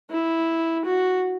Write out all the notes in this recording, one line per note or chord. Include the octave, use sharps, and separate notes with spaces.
E4
F#4